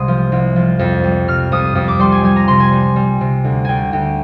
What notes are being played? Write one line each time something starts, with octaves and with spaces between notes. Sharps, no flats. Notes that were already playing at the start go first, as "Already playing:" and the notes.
Already playing: C2 C3 G#3 C6 D#6
F3
C2
F3
F2
G3
C3 F6
F2 D#6
F2 D#6
D6
G3 C6
G#5
G3 G#5
A#5
C3 C6
G#5
G3
G3
C3
D2
D2 G5 G#5
D2 G5